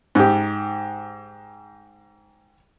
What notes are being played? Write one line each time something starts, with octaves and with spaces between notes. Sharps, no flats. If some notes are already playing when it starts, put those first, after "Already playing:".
G#2 G4